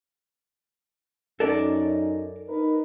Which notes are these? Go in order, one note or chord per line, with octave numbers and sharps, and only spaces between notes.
F#2 C#4 D#4 A4 A#4 D5
D#4 A#4 B4